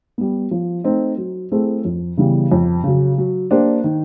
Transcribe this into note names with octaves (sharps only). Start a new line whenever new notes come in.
G3 B3
F3
A3 C4 D#4
F#3
A3 C4 E4 G#4
F2
C#3 E3 G3 B3
F2
C#3 F#3
F#3
A#3 D4 G4 C5
D#3